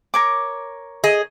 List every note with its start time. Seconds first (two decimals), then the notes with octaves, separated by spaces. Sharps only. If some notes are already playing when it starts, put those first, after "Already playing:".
0.14 A#4 C#5 D6
1.04 G#4 D#5